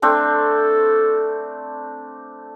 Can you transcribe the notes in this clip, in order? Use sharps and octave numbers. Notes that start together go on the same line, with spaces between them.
A3 C4 D4 A4